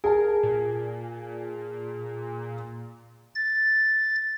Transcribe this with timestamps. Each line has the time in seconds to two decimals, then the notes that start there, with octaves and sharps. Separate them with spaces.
0.04 G#4 A#4 A5
0.43 A#2
3.35 A6